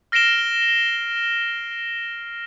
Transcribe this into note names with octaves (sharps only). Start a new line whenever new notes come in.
F6 A#6 C7 D7 E7 G7